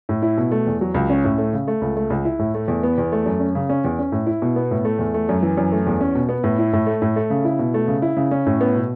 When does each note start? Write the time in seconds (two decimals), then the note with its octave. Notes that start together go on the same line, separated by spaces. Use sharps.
0.09 A2
0.22 E4
0.38 B2
0.51 A3
0.67 E2
0.81 F#3
0.94 C#2
1.10 C#4
1.24 A2
1.38 A3
1.53 C#3
1.68 A3
1.81 C#2
1.97 A3
2.10 C#2
2.25 E4
2.39 A2
2.54 A3
2.68 E2
2.83 B3
2.98 E2
3.12 A3
3.26 F#2
3.40 C#4
3.55 C#3
3.69 C#4
3.84 E2
3.99 C#4
4.12 A2
4.27 E4
4.42 B2
4.56 B3
4.71 A2
4.85 A3
4.99 E2
5.14 A3
5.29 F#2
5.43 E3
5.57 F#2
5.72 A3
5.87 E2
6.01 C#4
6.15 B2
6.29 B3
6.44 A2
6.59 E4
6.73 A2
6.87 A3
7.02 A2
7.16 A3
7.30 C#3
7.45 E4
7.59 B2
7.74 A3
7.88 C#3
8.02 E4
8.17 C#3
8.31 C#4
8.46 A2
8.61 B3
8.75 B2